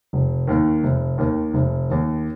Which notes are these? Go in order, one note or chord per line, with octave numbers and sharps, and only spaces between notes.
F1
D#2 D#3
F1
D#2 D#3
F1
D#2 D#3